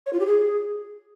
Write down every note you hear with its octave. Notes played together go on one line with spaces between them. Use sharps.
C#5
F4
G4
G#4